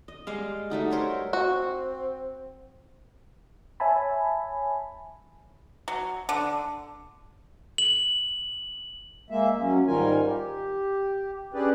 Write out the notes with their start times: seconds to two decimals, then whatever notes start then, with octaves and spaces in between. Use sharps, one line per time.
0.08 D#5
0.27 G3 G#3 F5
0.70 G3 A3 D#4 F#4
0.90 A#4 C5 C#5 E5
1.33 C4 F#4
3.80 C#5 E5 G#5 A5 B5
5.88 F#3
6.29 D3
7.78 F#7
9.30 G#3 A#3 E5
9.61 F#3 C#4
9.87 G#2 D#3 G3 F4 A#4 G#5
10.28 G4
11.54 C#4 D4 G4 G#4 B4 D5